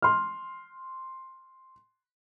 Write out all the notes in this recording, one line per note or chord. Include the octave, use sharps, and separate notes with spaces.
C6 F6